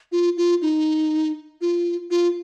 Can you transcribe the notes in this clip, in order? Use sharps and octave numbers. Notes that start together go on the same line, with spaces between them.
F4
F4
D#4
F4
F4